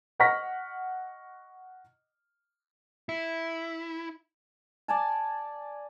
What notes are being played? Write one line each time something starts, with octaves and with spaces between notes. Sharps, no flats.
D#5 F#5 C#6 F6 A#6 B6
E4
D5 G#5 A5